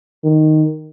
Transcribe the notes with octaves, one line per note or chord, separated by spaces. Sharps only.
D#3